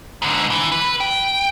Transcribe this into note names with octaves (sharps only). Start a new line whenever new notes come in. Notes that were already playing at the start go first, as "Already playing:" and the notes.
G#2 D3
E3
B4
G5